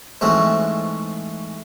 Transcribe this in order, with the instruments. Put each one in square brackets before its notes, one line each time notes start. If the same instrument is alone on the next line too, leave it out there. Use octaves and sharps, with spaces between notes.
[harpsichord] G#2 E3 A3 C4 C#4 F#4